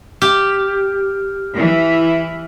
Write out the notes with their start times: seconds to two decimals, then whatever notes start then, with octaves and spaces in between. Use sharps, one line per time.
0.22 G4 F6
1.56 E3